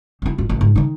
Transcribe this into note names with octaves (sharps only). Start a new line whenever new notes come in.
C4 E4
A1 F4
A1
G#2
D#3 D#4